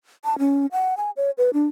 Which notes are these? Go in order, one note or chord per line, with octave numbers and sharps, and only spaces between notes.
A5
C#4
F#5
G#5
C#5
B4
D4